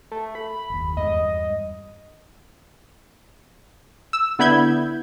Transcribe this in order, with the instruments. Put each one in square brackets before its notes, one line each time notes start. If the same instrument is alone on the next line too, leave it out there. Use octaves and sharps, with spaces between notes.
[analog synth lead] A3
B5
[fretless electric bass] F#1 D#2
[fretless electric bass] E2 G2 G#3 [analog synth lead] D#5
[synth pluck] E6
D3 B3 E4 B5 G6 G#6